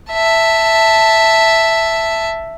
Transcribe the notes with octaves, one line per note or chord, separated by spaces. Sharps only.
E5 A5